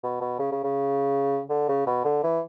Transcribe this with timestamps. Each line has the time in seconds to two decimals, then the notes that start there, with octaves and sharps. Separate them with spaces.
0.03 B2
0.21 B2
0.39 C#3
0.52 C#3
0.64 C#3
1.50 D3
1.69 C#3
1.86 B2
2.05 D3
2.23 E3